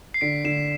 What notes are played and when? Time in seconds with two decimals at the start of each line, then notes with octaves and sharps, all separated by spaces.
0.14 C7
0.21 D3 B6 D7
0.44 D3 C7 E7